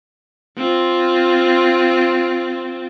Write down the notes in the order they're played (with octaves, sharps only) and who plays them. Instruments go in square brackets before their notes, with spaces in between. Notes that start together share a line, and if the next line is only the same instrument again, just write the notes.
[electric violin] C4 F4